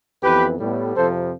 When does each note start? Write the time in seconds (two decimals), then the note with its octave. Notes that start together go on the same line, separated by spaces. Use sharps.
0.23 F2 E3 B3 G4 B4
0.59 A2 G3 B3
0.95 F2 C3 F3 A4 C5